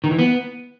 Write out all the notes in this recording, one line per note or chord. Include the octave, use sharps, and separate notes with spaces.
D#3
E3
B3